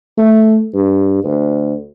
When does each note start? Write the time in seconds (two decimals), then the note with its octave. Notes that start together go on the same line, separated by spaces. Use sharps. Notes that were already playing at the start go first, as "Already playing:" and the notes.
0.18 A3
0.74 G2
1.24 D2